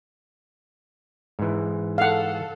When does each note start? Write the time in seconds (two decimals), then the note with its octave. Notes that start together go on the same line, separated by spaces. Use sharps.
1.39 G#2 E3
1.98 A4 F5 F#5